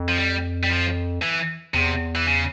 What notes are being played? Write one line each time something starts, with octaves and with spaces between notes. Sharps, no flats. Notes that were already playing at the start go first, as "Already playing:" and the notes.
Already playing: F2
F3
G3
G3
F3
E3
E2 C3
E3
C#3